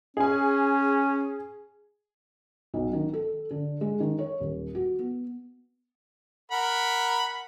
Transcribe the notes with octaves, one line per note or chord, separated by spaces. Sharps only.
C#4 G#4 G#5
B1
D#3
A4
D3
G#3
D#3
C#5
D#1
F#4
B3
A#4 F#5 B5